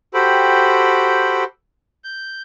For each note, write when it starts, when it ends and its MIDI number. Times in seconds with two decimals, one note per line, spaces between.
0.14 1.44 66
0.14 1.44 67
0.14 1.44 69
0.14 1.44 72
0.14 1.44 79
0.14 1.44 83
2.04 2.42 91